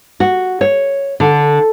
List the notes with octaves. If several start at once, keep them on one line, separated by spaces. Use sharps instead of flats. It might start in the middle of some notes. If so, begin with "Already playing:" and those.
F#4
C#5
D3